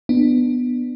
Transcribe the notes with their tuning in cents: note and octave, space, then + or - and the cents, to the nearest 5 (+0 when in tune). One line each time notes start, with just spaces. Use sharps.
B3 +0 D4 +20